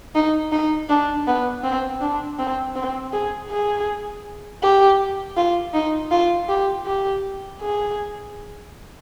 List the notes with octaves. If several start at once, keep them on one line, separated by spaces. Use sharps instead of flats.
D#4
D#4
D4
B3
C4
D4
C4
C4
G#4
G#4
G4
F4
D#4
F4
G4
G4
G#4